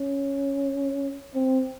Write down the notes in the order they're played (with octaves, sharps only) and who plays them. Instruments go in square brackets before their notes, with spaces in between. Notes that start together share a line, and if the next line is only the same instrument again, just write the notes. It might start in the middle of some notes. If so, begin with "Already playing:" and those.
Already playing: [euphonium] C#4
C4